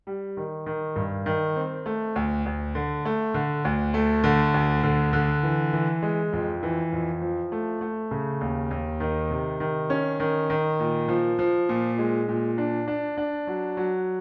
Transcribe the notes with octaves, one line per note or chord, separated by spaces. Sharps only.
G3
D#3
D#3
G2
D#3
C4
A3
D2
D2
D3
A3
D3
D2
A3
D3
D2
D3
D3
E3
E3
G#3
F2
E3
F2
F3
A3
A3
C#3
D#2
D#2
D#3
C3
D#3
C#4
D#3
D#3
A#2
F3
F3
A#2
G#3
A#2
D4
D4
D4
F#3
F#3